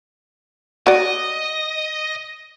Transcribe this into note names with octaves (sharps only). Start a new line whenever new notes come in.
F#4 D5 D#5